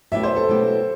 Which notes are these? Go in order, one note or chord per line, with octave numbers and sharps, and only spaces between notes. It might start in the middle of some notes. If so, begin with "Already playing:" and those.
B2 F#3 A3 E4 G4 E5
C5
A4
B2 F#3 A3 E4 G4